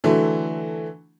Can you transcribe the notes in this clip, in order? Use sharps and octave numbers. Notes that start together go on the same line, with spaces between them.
D3 E3 F#3 A3